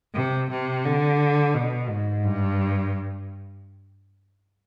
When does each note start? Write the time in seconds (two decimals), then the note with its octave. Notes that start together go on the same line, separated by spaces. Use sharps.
0.15 C3
0.51 C3
0.85 D3
1.55 B2
1.89 G#2
2.24 G2